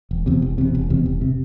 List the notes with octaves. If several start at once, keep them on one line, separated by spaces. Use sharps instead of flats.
E1
E2 C3
E1
E2 C3
E1
E2 C3
E1
C3